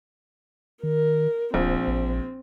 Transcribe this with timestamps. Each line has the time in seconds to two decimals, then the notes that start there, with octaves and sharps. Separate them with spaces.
0.83 D#3 A#4
1.54 D1 A#1 C4
1.87 A1